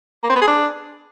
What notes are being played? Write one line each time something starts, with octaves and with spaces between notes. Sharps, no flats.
A#3
C4
B3
G#4
D4